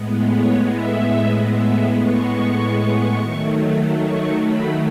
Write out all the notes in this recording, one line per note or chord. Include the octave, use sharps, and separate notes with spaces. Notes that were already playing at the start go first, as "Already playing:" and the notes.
Already playing: A2 G#3 B3
C#5
E5
E5
C#6
D#3 F#3 A3
C#6
B5